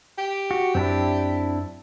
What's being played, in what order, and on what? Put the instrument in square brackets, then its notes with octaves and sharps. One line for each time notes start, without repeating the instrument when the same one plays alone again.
[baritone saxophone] G4
[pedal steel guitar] F#4
[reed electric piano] F#2 [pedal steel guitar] C4 D4 E4